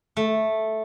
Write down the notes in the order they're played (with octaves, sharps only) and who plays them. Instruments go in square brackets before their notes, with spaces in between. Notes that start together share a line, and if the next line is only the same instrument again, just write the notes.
[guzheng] A3